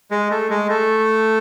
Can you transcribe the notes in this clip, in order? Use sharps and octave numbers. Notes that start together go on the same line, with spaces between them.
G#3
A3
G#3
A3